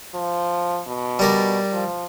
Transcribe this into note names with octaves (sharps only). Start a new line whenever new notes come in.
F3
B2
G3 A#4 D5
F3